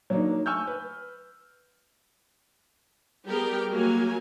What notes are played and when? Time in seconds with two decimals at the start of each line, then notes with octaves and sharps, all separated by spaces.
0.10 F#3 A#3 D4 D#4
0.46 G#5 C#6 E6 F6 G6
0.67 B4
3.27 G3 B3 G4 G#4 A#4 G5
3.70 F#3 A#3 F#4 A#4 G#5